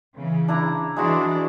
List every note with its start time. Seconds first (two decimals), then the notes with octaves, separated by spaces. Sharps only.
0.16 C#3 E3
0.48 D4 E4 A#5
0.97 E3 G#3 D4 E4 F#4